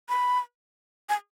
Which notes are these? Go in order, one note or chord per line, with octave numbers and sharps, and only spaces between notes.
B5
G#5